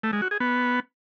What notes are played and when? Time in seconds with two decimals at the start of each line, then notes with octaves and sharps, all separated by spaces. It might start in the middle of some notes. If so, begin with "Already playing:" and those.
0.03 A3
0.13 G#3
0.22 F#4
0.31 G#4
0.40 B3